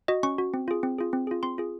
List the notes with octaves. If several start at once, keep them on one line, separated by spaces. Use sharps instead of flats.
F#4 D#5
C#4 C#6
F#4
C4
F4 G#4
C4
F4 G#4
C4
F4 G#4
C4 C6
F4 G#4